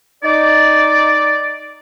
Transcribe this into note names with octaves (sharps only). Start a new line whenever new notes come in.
D#4 D5